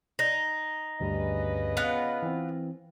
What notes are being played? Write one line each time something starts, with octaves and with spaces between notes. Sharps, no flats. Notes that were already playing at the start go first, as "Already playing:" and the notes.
D#4 A#6
D2 G2 C#3 G3 B4 D#5
B3 F4 F#5
E3 C4